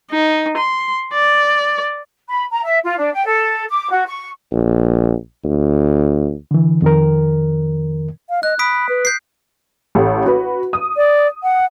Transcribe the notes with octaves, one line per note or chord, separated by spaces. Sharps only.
D#4
C6
D5
B5
A#5
E5
F4
D4
G5
A4
D6
F#4
C#6
A#1
D2
D3 E3
F2 D#3 A#4
F5
D#5 F#6
B5 D#6 B6 D7
B4
G6 C7
A1 G4 A4
F#4 B4
D#6
D5
F#5